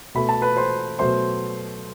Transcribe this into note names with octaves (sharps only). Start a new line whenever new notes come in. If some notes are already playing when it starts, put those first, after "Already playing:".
B2 A3 B5
A5
B4 B5
C5 C6
B2 F#3 A3 C5 C6